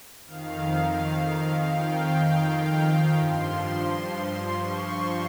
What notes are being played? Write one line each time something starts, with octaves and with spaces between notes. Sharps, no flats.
F2 D#3 F5
G5
G2 F3 C6
C#6